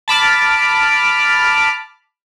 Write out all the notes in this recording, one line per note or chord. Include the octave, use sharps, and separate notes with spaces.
A5 B5 D6 F6